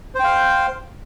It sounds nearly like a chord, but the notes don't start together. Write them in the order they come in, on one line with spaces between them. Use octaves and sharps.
C5 G5 F5